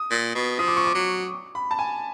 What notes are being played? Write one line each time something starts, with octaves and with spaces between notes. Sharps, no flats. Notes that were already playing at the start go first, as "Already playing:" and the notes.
Already playing: D#6
A#2
B2
F3 D#6
D6
C#6
D6
F#3
B5
A5
G#5